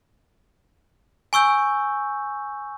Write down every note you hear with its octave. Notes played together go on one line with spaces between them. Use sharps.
G#5 C#6 E6 G6